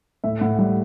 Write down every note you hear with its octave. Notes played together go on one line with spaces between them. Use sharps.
A2 E5
A2 F#5
G3 F#5